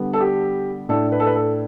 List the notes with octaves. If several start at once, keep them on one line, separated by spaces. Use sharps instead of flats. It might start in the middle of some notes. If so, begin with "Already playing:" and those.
Already playing: D3 G3 B3
A4
G4
A2 A3 D4 A4
B4
A4
B4
A4